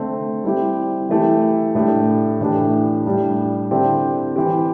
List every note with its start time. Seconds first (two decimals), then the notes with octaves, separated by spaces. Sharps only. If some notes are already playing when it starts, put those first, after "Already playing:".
Already playing: D3 A3 C4
0.44 G3 C4 E4 G4
1.09 E3 A3 E4 G4
1.75 A2 A3 D4 G4
2.41 A2 E3 A3 D4 G4
3.06 A2 G3 D4 G4
3.71 D3 C4 E4 G4
4.36 E3 C4 G4